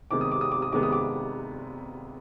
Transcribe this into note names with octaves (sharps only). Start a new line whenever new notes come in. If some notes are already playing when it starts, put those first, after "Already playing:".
C3 D#3 G#3 B3 D6
D#6
D6
D#6
D6
D#6
C3 D#3 G#3 B3 D6
D#6
D6